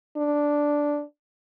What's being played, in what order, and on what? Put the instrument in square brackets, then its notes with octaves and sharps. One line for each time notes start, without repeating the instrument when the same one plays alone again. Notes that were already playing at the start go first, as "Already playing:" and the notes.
[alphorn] D4